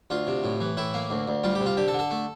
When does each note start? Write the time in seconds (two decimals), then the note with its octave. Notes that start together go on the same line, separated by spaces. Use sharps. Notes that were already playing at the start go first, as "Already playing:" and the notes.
0.10 D2 F4
0.27 C3
0.44 A2
0.61 E3
0.77 A2 E4
0.94 A#3
1.10 D2
1.28 D2
1.43 G3 F4
1.55 G4
1.60 C3
1.66 F4
1.77 D3 G4
1.88 A4
1.94 D3
1.99 A4
2.11 A3